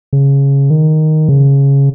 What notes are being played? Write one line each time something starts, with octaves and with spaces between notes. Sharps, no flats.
C#3
D#3
C#3